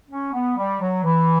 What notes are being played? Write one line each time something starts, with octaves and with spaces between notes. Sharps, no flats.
C#4
B3
G3
F#3
E3